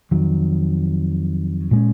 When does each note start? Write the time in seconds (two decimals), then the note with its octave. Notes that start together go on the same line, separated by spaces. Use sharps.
0.11 F2 D#3 F#3
1.71 A#2 G#3 C#4